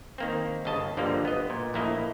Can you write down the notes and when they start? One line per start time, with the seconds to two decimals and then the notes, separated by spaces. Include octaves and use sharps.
0.18 D#3 A#3 C4
0.65 G1 C#3 D#5 A5
0.97 G1 D3 F3 G3 A#3
1.25 B3 D#5
1.50 A#2
1.74 A#1 A2 A#3 E4 D#5